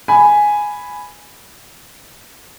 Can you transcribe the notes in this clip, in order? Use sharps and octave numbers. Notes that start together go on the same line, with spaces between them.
G#5 B5